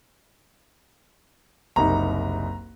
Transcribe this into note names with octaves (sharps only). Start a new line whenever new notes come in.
F#1 C2 D#4 A#5